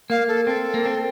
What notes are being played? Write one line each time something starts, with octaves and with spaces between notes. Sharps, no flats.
A#3 F5
A4
C4 A4
A#3
C4